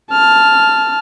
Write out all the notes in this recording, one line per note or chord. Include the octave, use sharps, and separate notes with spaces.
A5 F6